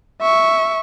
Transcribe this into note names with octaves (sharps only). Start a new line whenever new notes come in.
E5 C#6